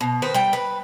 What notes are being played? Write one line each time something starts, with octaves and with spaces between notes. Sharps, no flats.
B2
D#3 B4 C5
G3 G5
B4